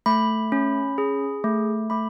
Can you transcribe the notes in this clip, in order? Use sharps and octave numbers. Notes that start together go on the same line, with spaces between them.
A3 B5
C#4
G#4
A3
A3 B5